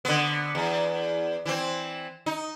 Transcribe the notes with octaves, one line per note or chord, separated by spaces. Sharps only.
D3 B3
E2
E3 C4
D#4